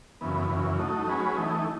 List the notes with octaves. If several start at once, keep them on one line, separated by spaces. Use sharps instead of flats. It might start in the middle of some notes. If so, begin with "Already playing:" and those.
F#2 C#3 E3 B3
F#2 C#3 E3
F#3 A3 D#4
F#3 C#4 G#4 B4
E3 A3 D#4